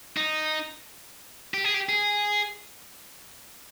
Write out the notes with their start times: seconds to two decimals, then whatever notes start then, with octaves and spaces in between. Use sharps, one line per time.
0.17 D#4
1.54 G4
1.64 G#4
1.74 G4
1.89 G#4